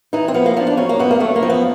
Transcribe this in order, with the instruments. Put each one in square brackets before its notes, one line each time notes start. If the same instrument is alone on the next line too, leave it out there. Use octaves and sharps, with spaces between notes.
[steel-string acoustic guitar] E3 D#4
C4
F3 B3
A#3
F3 D4
D4
F#2 C#4
A#3
F#2 B3
A#3
F#2 A3
A#3
F3
B3